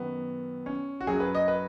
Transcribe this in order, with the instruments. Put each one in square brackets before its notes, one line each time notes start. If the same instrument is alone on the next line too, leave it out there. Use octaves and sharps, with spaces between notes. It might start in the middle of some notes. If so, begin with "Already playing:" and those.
Already playing: [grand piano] F#2 D#3 F#3 B3
C#4
F#4
F#2 F#3 G#4
B4
D#5
B4